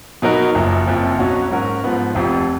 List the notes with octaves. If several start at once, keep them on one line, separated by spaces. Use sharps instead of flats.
B2 F#3 B3 D#4 A#4
F#1 F#2 F3
F#1 F2 F3
B1 B2 F#3 C#4 F#4
G#2 F#3 C#4 F#4 A#4
G#2 F3 B3
F1 F2 F3